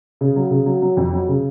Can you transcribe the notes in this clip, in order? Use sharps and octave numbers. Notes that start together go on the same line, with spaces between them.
C#3
F#3
C#3
F#3
F#3
F2
F#3
C#3